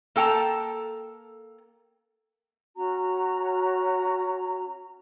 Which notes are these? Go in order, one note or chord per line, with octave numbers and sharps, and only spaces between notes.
A#3 A4 G5 A5 A#5
C#4 F#4 A#5